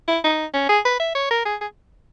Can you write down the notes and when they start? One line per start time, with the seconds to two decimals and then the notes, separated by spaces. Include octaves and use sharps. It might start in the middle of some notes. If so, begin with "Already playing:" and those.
0.08 E4
0.24 D#4
0.54 C#4
0.69 G#4
0.85 B4
1.00 E5
1.15 C#5
1.31 A#4
1.45 G#4
1.61 G#4